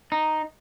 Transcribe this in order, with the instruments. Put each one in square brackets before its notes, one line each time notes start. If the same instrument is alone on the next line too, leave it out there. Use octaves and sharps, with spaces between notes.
[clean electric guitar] D#4